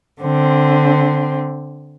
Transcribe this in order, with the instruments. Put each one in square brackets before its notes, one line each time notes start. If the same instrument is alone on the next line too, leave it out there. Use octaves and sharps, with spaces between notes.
[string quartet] D3 C4